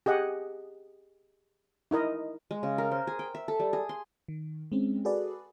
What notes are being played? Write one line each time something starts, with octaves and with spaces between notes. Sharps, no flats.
G4 G#4 D#5 F#5
D#4 E4 A#4 D#5
G#3
C#3
A#4
C5
G#4
G5
E5
A4
G3
G#4
C6
D#3
G#3 C4 C#4
F#4 G#4 A4 B4 D5